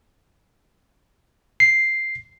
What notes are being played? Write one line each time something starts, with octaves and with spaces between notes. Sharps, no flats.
C7